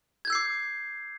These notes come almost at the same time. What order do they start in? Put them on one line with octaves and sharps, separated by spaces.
G#6 G6 E6 C7 D6